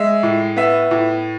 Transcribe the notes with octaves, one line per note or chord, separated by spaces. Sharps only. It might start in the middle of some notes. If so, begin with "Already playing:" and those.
Already playing: G#3 E5
A2
B3 E5
A2